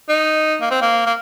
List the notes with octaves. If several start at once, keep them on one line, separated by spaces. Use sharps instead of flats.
D#4
A#3
C4
A#3
A#3